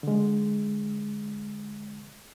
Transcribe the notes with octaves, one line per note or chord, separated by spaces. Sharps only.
D3 G#3